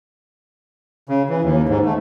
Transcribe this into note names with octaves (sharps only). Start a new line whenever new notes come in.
C#3
E3
D#2
G#2
A3